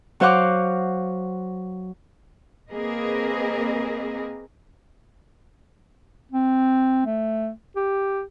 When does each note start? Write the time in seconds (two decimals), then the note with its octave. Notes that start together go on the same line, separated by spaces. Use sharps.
0.20 F#3 F#4 C5 F5 F#5 D6
2.70 A#3 C4 G#4 A#4 B4 D#5
6.32 C4
7.06 A3
7.76 G4